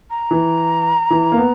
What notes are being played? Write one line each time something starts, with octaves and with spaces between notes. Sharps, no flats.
A#5
E3
E3
A#3
B3